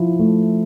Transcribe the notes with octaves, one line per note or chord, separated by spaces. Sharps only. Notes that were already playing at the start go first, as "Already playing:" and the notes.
Already playing: F3 E4
A3